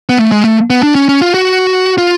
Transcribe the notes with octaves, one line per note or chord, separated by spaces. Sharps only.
B3
A3
G#3
A3
B3
D4
C#4
C#4
F4
F#4
F4